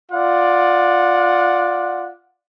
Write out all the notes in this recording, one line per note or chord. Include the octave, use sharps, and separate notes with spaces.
F4 D5 F#5